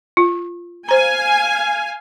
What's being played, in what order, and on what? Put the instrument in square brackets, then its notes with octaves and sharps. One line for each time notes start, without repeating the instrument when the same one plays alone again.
[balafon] F4
[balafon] C5 A#5 [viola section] F5 G#5